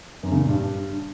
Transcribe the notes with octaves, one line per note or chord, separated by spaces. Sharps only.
F#2
C#3
A#2
G2